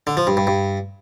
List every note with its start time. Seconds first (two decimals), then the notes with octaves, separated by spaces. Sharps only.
0.07 D3
0.17 F3
0.27 G2
0.37 G2
0.47 G2